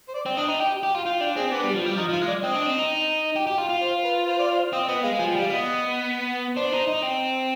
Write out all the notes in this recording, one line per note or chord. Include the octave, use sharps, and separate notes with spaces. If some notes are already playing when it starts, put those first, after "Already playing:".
C5
D5
C4
D4 D#5
D#4
G4 G5
G4
F4
F4 G5
D4 G5
C4 G#4
B3 D4
G3
F3
G3
F3 D#4
F3 F4
G#3
D5
C4 D#5
D4
C4
D#4
G4
G4
F4
F4
C5
B4
C5
D5
C5
C4 D#5
B3 D#5
G#3 F5
F3 G#5
G5
G3
F5
B3 D#5
D4 C5
D#4
D#4
C4